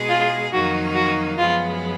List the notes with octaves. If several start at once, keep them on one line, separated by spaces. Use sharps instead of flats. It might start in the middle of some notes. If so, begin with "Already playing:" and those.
Already playing: B2 G#3 D#4 G#4
F4
F2 D#3 F#3 A#3 D#4 F#4
F#4
F#2 F3 G#3 B3 F4